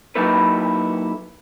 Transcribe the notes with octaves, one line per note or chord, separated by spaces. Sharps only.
F#3 A#3 D#4 E4 A4 B4